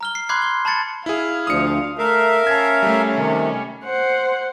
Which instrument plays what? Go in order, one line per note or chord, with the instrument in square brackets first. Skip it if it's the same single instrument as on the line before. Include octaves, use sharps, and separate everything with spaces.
[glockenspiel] A#5 F6 G7
C7
B5 C6 D6 F#6 G#6 C7
G7
A5 B5 G#6 A6 C#7
[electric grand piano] E4 G#4 [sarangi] F5
[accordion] D2 D3 F3 [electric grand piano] D#6 C#7
[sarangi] A3 [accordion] A#4 E5 F5
[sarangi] C#4 [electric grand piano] A5 G#6
[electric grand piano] G3 A3
[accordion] C3 D#3
[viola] C5 F#5